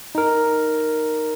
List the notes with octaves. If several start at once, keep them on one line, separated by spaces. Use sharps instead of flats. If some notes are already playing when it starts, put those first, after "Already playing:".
D#4 A#4